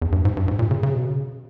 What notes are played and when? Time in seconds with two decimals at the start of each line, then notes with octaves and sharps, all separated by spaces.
0.02 E2
0.12 G2
0.25 G#2
0.37 G2
0.48 G#2
0.59 A#2
0.71 C#3
0.83 C#3
0.94 B2
1.05 C#3